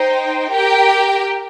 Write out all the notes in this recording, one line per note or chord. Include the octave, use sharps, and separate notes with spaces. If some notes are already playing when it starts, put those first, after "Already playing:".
Already playing: D#4 C5 G5
G4 A#4 G5